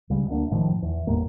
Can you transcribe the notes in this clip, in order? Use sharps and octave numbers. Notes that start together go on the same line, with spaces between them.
C#2 C#3 G3
D2 D3 A#3 D4
F#1 A2 D#3 F3
E2
G1 E2 A2 A#3